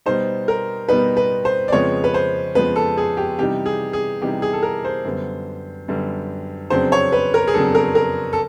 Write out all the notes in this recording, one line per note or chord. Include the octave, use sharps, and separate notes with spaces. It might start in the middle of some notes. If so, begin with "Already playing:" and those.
B2 G3 B3 D#4 C5
A#4
B2 G3 B3 D#4 B4
B4
C5
D5
F2 C#3 F3 G#3 B3 C#5
B4
C5
F2 C#3 F3 G#3 B3 B4
A4
G#4
G4
C3 E3 G3 B3 D#4 G4
G#4
G#4
C3 E3 G3 B3 D#4 G4
G#4
A4
A#4
C5
F#2 D3 G3 B3
F#2 D3 G3 B3
F2 C#3 F#3 B3 D4 C5
C#5
B4
A#4
G#4
F2 C#3 F#3 B3 D4 A4
A#4
A#4
A4